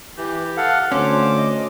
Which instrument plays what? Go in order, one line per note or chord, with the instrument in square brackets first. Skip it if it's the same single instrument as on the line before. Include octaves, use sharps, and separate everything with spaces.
[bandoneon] E3 [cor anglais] G4
[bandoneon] A4 F5 F#5
[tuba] D2 [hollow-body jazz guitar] C#4 [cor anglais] C5 [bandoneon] D6
[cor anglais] D#5